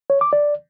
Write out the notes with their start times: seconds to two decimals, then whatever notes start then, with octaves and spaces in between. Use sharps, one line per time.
0.10 C#5
0.21 D6
0.33 D5